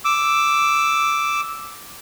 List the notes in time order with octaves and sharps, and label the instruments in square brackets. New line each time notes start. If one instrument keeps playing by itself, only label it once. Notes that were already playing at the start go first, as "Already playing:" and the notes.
[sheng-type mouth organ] D6 E6